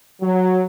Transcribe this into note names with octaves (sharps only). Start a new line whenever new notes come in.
F#3